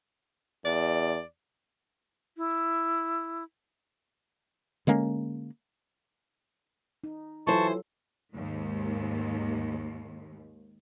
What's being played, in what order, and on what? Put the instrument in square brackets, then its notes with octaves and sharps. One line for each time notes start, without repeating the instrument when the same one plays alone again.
[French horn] E2 [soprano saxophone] D5
[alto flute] E4
[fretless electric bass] D3 G#3 A#3 C#4
[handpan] D#4
[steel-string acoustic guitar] E3 C5 [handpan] F#3 F4 A4 [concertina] A5 C#6
[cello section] D#2 G#2